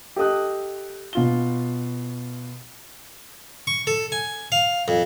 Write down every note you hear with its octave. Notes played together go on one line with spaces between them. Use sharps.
G4 A4 D#5 D#6 F#6
B2 F4 G7
C#6
A4
G#5
F5
F2